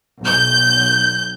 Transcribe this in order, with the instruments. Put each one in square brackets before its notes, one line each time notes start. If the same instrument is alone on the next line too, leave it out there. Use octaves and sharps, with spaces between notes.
[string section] B1 G6